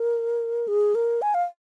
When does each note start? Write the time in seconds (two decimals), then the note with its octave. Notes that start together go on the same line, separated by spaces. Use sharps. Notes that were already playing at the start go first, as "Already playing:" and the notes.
Already playing: A#4
0.68 G#4
0.95 A#4
1.22 G#5
1.34 F5